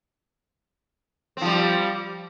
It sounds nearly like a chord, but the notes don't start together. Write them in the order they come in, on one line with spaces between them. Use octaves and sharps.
C4 F3 G3